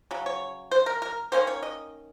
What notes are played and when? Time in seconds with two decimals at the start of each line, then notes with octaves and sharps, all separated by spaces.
0.11 C#3 F#3
0.26 C#5
0.71 C5
0.86 A#4
1.02 A#4
1.32 D#3 A#3 C#4 C5
1.47 C#5
1.62 D#5